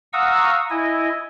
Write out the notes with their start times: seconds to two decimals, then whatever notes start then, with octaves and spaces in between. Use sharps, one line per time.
0.13 F5 F#5 A#5 C#6 D#6 E6
0.70 E4 D#5 G#5